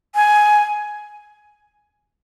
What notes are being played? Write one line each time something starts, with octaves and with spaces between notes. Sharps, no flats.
G#5